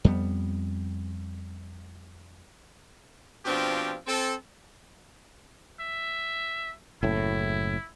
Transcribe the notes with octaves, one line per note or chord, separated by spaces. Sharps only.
F2 G3 B3
B2 F3 C4 D4 F4 G4
C4 A4
E5
F#1 A2 E4